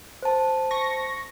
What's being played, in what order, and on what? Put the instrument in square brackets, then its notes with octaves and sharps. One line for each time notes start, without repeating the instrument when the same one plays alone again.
[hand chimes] C5 A5
[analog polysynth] C#6 A#6